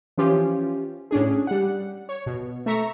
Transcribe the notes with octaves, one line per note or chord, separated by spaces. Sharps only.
E3 F3 C#4 F4 G4
A2 C#4 D4 G#4
G3 F#5
C#5
B2
A3 E5 A#5 C#6